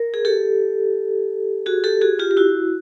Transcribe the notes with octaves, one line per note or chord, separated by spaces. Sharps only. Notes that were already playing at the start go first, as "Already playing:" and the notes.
Already playing: A#4
G#4
G4 A4
F#4 G#4
G4 A4
F#4 G#4
F4 G4
G4
E4 F#4